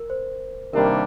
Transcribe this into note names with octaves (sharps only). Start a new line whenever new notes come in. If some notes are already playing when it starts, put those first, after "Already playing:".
Already playing: A#4
C5
C3 D#3 G3 A#3 D4 A#4